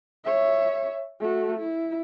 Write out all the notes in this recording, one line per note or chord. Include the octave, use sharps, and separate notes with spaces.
C#5 E5
A3 F#4
E4